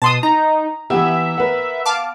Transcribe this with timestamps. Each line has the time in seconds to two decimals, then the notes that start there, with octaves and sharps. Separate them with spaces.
0.02 B2 A5 C6 D#6
0.23 D#4 A#5
0.90 E3 B3 G4 E5
1.38 A#4 B4 F#5
1.86 F5 A5 D6